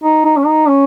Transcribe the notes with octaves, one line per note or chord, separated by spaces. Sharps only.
D#4
D#4
C#4
D#4
C#4